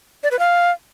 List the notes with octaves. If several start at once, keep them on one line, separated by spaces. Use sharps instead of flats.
D5
B4
F5